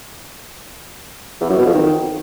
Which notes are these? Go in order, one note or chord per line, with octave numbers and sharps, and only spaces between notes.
E2
F#2
B2
F2
D#3